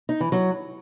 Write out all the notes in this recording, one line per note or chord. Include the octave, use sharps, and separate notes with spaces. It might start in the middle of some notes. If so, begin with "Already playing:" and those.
D#4
E3
F#3